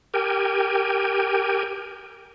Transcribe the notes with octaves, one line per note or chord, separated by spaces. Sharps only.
G4 A#4 G5 G#5